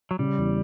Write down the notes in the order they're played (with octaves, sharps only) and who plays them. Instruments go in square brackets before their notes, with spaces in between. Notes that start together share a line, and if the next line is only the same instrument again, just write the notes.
[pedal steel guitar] F#3
[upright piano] C#3 [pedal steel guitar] G3
[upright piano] E2